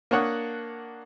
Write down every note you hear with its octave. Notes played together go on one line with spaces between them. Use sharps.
A#3 D4 C#5 F#5 D#6